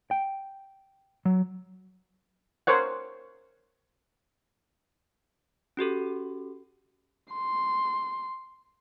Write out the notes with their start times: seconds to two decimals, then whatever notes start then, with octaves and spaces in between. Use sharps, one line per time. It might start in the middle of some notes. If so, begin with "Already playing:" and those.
0.11 G5
1.25 F#3
2.67 A#4 C5 C#5 F#5
5.77 C#4 F#4 G4 A4
7.33 C6